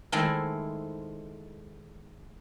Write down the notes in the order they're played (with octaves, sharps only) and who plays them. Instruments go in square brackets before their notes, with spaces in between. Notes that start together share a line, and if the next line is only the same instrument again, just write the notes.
[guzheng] D#3 G#3 A3 C4 E4